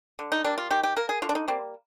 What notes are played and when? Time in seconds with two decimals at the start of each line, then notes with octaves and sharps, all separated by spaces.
0.19 D3
0.32 D#4
0.44 G3 A#3 D4
0.58 F4
0.70 D#3 G4
0.83 G4
0.96 A#3 A#4
1.09 G#4
1.22 D3 F4
1.29 D4
1.35 D#4
1.48 G3 A#3 C4